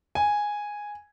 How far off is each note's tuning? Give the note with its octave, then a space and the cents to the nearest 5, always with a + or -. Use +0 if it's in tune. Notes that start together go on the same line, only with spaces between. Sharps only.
G#5 -5